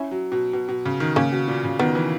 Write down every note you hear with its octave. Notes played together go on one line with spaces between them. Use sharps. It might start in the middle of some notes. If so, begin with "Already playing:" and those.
Already playing: C#4 E4
F#3
B2
B2
B2
C#3
D#3
C#3 A#3 C#4
B2
A#2
C#3
D#3 B3
E3